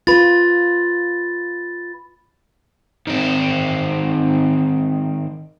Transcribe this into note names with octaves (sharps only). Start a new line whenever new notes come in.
F4 B4 B5 A6
D#3 C4